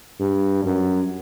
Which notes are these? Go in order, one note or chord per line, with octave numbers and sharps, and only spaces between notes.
G2
F#2